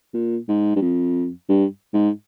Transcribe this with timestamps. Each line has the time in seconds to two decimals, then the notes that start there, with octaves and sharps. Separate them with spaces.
0.14 A#2
0.48 G#2
0.76 G2
0.82 F2
1.49 G2
1.94 G#2